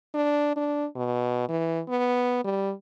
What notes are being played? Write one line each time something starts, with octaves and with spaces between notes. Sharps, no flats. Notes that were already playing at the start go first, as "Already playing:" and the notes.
D4
D4
B2
E3
B3
G3